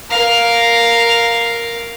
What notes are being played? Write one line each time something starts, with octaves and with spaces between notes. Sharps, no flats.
A#4 F5